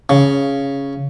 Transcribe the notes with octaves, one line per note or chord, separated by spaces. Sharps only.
C#3